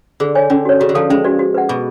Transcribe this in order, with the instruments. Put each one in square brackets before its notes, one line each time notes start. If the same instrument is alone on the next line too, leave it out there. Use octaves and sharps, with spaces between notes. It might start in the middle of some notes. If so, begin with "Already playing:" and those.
[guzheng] D3 [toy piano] G#4
[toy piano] C#5 G#5
[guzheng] D3 [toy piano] C#4
[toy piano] F#4 C#5
[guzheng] C#3 [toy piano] F#4
[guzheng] D3
[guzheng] F3 [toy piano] A4 F5 A5
[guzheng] G#3 [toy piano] C#4
[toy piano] F#4 B4 D5
F#4
B4 D5 F#5
[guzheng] B2 [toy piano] G#4